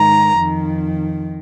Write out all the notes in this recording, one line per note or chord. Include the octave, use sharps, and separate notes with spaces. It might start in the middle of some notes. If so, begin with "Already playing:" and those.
Already playing: G#2 D#3 A#5
F2 D#3